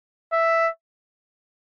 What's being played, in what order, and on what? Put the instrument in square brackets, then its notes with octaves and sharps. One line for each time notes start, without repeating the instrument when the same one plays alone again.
[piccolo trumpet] E5